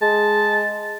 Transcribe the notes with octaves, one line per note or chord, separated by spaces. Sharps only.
G#3 A5